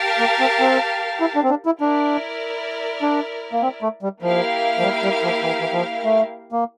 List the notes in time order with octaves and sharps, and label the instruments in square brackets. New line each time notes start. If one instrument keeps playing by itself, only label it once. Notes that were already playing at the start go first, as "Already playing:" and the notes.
Already playing: [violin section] G4 A#4 F5 A5
[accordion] A#3
C4
C4
E4
D4
C4
D4
E4
[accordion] D4 [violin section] E4 A#4 D5
[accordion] D4
A#3
C4
A3
G3
[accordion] F3 [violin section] A#3 E4 G4 A#4 F5
[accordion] F3
G3
G3
F3
E3
E3
F3
A3
A#3